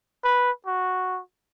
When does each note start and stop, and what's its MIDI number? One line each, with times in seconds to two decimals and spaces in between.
0.24 0.51 71
0.67 1.21 66